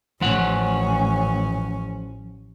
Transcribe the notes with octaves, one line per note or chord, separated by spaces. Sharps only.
A1 F3 C#4 F#5